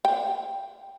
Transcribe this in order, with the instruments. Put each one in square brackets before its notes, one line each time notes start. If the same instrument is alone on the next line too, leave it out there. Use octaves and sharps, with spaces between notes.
[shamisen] G5